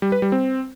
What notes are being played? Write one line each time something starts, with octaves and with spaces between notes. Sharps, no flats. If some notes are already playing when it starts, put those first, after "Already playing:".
G3
B4
G3
C4